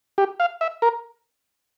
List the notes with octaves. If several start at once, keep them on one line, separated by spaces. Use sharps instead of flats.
G4
F5
E5
A#4